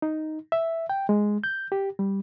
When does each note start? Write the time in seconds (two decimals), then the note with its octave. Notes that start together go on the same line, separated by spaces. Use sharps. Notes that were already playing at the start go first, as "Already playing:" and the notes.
0.02 D#4
0.52 E5
0.90 G5
1.09 G#3
1.44 G6
1.72 G4
1.99 G3